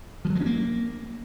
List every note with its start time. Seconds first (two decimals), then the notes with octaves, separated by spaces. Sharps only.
0.25 F3
0.30 F#3
0.35 G#3
0.41 C#4
0.46 A#3